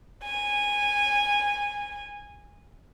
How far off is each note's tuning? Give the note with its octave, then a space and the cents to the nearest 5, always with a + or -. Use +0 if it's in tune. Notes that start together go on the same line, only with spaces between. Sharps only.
G#5 -15